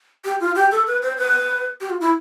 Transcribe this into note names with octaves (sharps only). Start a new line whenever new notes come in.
G4
F4
G4
A4
B4
C5
B4
G4
F4
E4